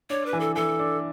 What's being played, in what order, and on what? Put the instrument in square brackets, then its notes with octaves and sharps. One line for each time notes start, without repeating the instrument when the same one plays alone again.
[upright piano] D4 [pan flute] C#5
[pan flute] B4
[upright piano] E3
[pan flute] A4
[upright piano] E3 [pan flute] A4
[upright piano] D4